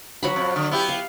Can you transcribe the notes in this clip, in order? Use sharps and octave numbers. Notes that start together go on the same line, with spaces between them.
F#3 F#4 B5
F2
D3
B3 E4 G4
F5